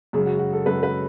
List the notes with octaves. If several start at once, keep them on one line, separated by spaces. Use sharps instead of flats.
F#2 C#3 G#3 G#4
F#4
F#4
A4
F#2 C#3 G#3 B4
B4